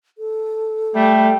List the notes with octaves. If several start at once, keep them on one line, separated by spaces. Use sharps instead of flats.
A4
G3 A3